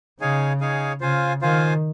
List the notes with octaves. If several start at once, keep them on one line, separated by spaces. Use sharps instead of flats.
C#3 D#4 G#4 C#5 F5 G#5
D#4 G#4 C#5 F5 G#5
C#3 F4 C5 F5 G#5
D#3 F4 C5 F5 G#5